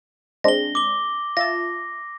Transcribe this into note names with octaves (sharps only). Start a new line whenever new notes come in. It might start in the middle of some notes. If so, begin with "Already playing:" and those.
G#3 C4 D4 A#6 G7
D6 G7
F4 E5 A5 A#6